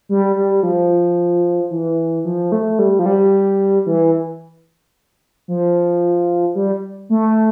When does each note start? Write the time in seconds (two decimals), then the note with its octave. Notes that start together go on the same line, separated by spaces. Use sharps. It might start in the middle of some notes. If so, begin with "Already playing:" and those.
0.09 G3
0.36 G3
0.63 F3
1.71 E3
2.25 F3
2.52 A3
2.79 G3
2.99 F3
3.06 G3
3.86 E3
5.48 F3
6.55 G3
7.09 A3